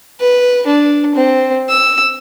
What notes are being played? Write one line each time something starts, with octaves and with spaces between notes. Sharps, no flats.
B4
D4
C4
E6